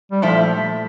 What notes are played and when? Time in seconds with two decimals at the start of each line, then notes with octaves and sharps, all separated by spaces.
0.12 G3
0.22 A#2 F3 A3 E4 G4